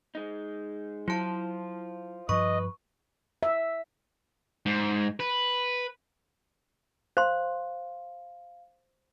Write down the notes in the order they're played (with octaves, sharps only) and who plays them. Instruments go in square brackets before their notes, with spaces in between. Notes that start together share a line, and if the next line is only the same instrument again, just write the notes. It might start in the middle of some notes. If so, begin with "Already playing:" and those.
[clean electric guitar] G#3 D#4
[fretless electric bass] F#3 [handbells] E4 A5 [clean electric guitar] F4 C5
[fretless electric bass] G2 F3 [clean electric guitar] B4 [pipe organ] D#5 [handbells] C#6
[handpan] E5
[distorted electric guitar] G#2
B4
[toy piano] C5 C6 [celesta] F5